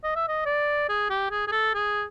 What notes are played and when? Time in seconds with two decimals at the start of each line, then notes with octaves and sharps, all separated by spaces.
0.03 D#5
0.15 E5
0.28 D#5
0.46 D5
0.89 G#4
1.10 G4
1.31 G#4
1.47 G#4
1.52 A4
1.74 G#4